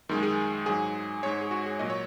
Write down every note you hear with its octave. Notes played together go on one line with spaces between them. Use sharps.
F#2 D#3 G#3
G#4
G#2 F#3 G#4
G#2 G#3 C#5
G#4
F#4
G#4
A#2 F#3 D#5
C#5